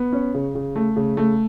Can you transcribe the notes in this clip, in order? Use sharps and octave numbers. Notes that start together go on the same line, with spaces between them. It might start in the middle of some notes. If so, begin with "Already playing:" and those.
Already playing: B3
C#4
C#3
C#3
A3
C#3
A3